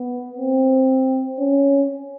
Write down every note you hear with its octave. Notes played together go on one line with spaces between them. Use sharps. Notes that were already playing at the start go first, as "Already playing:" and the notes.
Already playing: B3
C4
C#4